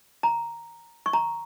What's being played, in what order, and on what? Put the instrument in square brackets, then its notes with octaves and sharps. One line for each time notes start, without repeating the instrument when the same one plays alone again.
[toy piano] A#5
C#6
A#5